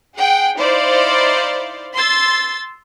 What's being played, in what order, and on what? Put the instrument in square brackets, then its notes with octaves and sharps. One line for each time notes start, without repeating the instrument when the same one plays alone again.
[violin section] G#4 F#5 G5
D#4 E4 C5 D5 F5
C6 E6 A6